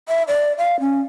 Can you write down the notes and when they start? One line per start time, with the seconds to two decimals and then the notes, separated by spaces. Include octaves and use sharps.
0.08 E5
0.28 D5
0.58 F5
0.80 C#4